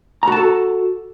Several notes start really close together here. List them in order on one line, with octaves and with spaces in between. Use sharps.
A#5 F#4 A5 A4